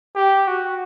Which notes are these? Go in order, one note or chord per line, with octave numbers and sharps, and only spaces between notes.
G4
F#4